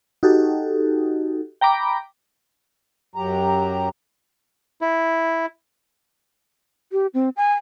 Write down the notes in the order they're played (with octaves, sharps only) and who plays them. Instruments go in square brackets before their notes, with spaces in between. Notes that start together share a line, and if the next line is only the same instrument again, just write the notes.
[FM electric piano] D#4 F#4 G4 A4
G5 A#5 B5 D6
[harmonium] F#2 F#3 G4 A#5
[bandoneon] E4
[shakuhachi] G4
C4
G#5